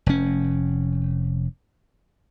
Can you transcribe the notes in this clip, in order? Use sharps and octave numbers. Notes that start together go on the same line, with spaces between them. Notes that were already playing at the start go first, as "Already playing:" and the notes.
F1 C#4